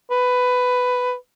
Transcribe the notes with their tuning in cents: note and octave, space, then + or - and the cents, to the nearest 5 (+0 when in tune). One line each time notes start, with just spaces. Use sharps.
B4 +10